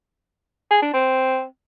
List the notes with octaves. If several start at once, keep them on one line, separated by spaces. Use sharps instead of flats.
G#4
D4
C4